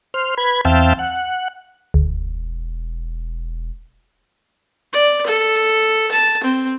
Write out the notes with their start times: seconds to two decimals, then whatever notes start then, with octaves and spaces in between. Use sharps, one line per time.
0.14 C5 F6
0.37 B4 B5 G#6
0.65 E2 C4 E5 F5 G5 A5
0.99 F#5
1.94 E1 D2
4.93 D5
5.26 A4
6.12 A5
6.43 C4